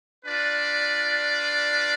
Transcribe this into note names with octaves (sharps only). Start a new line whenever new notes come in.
D4 F4 B4 D5